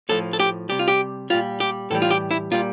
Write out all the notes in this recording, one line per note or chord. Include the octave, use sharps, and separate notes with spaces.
A2 F3 A4
A4
G4
C3 G3 G4
F4
G4
A#2 G3 F4
G4
A2 E3 G3 A4
F4
G4
E4
A#2 G3 F4